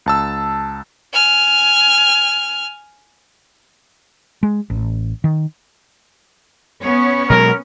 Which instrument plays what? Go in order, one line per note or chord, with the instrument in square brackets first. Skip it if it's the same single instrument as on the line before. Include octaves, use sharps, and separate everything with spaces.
[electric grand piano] C#2 A5 E6
[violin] G#5 F6
[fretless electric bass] G#3
A1
D#3
[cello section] B3 C#4 C#5
[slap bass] B2 F#3 G#3 [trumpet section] A#4